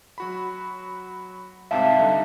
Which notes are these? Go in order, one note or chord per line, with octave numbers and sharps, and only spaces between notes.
F#3 F#4 B5
C2 G#2 C3 E5 F5 A5
D3 G3 D#4